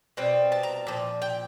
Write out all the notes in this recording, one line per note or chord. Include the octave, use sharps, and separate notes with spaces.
B2 G3 C4
A5
A#5
A#2 F3
G5